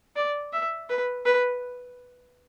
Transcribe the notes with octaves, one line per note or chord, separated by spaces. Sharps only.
D5
E5
B4
B4